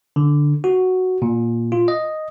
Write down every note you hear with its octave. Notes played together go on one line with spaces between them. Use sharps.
D3
F#4
A#2
F4
D#5